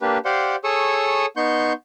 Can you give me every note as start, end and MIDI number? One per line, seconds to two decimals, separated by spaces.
0.02 0.18 58
0.02 0.18 62
0.02 0.18 67
0.02 0.18 71
0.25 0.56 67
0.25 0.56 72
0.25 0.56 74
0.25 0.56 77
0.25 0.56 78
0.25 0.56 84
0.64 1.26 68
0.64 1.26 69
0.64 1.26 73
0.64 1.26 85
0.64 1.26 87
0.64 1.26 88
1.37 1.73 59
1.37 1.73 63
1.37 1.73 84
1.37 1.73 85
1.37 1.73 91